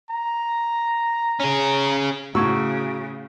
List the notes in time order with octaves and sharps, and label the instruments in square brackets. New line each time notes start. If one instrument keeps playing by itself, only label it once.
[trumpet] A#5
[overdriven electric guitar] C#4 G#4
[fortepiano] A2 E6 [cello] C#3 [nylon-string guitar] F#4 [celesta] A#5 C#6 G#6